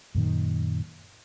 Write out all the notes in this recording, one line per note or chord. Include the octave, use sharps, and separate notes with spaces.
F#2 A#2 D#3